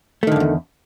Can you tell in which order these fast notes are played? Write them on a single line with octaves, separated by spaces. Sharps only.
A3 D#3 D3 G2 E2